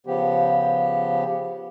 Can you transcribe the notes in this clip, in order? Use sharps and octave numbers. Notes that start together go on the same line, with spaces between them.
C#3 F3 B3 G4